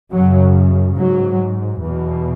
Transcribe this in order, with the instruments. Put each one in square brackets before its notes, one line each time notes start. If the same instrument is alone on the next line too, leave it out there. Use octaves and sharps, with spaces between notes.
[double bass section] F#2 C#3 F#3
G#2 F#3
E2 B2